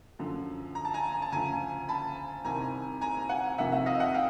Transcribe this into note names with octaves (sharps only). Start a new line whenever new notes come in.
F#2 D3 F3
A#5
A5
G#5 A#5
A5
D2 C#3 F3 G#5 A#5
A5 B5
C2 C3 D#3 G#5 A#5
G#5 A#5
F#5 G#5
F2 C3 D#3 E5 F#5
E5 F#5
D#5 F5
E5 F#5
F5 G5